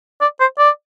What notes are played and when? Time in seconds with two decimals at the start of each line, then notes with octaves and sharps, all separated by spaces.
0.21 D5
0.40 C5
0.58 D5